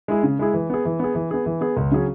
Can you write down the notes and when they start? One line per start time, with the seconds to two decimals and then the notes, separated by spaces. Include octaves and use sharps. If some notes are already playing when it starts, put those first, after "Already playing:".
0.08 G#3 E4 G#4
0.23 C#3
0.39 G#3 E4 G#4
0.54 E3
0.70 B3 G#4
0.85 E3
0.99 B3 G#4
1.15 E3
1.31 B3 G#4
1.46 E3
1.61 B3 G#4
1.77 C#2
1.92 C#3 F#3 C#4 G#4